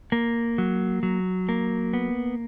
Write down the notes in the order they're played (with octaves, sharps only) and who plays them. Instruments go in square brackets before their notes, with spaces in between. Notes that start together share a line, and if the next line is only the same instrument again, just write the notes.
[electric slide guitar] A#3
F#3
F#3
A#3
B3